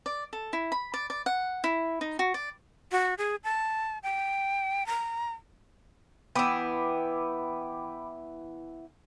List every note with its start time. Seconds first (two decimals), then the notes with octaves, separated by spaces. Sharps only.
0.06 D5
0.33 A4
0.53 E4
0.72 B5
0.94 D5
1.10 D5
1.26 F#5
1.64 E4
2.01 D#4
2.19 F#4
2.34 D5
2.92 F#4
3.18 G#4
3.44 A5
4.03 G5
4.86 A#5
6.36 E3 B3 G5 B5 D6